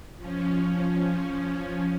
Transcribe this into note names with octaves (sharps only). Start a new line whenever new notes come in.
F3 C#4